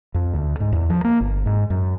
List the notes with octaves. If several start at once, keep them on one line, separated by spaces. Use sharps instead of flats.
F2
D2
G#2
E2
F3
A#3
G1
G#2
F#2